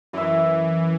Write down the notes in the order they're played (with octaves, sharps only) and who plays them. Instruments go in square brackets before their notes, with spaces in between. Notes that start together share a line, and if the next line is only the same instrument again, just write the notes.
[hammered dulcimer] F#2 E5 [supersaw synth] E3